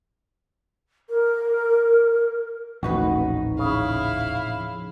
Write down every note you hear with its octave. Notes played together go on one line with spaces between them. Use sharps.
A#4
D#1 A1 F2 A2 D#4 F#4 B4
C#3 E4 F5